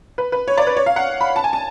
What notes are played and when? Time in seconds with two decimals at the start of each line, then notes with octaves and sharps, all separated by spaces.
0.18 B4
0.32 B4
0.48 C#5
0.57 D5
0.67 B4
0.77 C#5
0.86 F5
0.96 F#5
1.21 B5
1.36 A5
1.44 G#5
1.53 A5